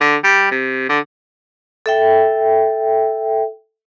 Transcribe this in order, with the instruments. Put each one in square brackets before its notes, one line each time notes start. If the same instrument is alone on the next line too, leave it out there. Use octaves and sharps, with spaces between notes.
[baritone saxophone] D3
G3
C3
D3
[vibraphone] A4 E5 G5